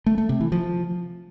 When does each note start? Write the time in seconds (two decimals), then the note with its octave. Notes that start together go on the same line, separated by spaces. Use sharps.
0.06 A3
0.18 A3
0.29 C3
0.41 E3
0.52 F3